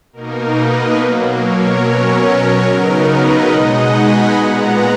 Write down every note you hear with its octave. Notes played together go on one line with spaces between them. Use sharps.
B2 A#3 D#4 A#4
B4 D#5
B2 F#3 A#3
A#4 C#5
B2 F#3 C#4 A#4 C#5
A#4
C#3 F#3 B3 D#4 A#4
B4 D#5
B2 G#3 D#4 D#5 F#5
G#5 B5
A#2 G#3 B3 F#5 A#5